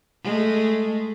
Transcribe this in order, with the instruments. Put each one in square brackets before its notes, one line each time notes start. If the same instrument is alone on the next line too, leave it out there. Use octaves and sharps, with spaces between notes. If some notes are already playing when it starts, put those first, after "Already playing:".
[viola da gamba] G#3 A3